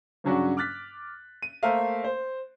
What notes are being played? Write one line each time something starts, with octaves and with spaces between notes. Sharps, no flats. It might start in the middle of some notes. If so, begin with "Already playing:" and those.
G2 C#3 F#3 C#4 D4 F#4
D6 F6 F#6 A6 B6
D#7
A3 A#3 A#4 C5 E5 F5
C5